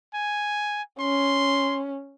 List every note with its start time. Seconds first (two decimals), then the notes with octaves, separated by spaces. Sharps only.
0.14 G#5
1.00 C#4 C6